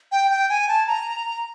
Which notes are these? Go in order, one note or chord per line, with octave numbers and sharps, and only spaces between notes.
G5
G5
G#5
A5
A#5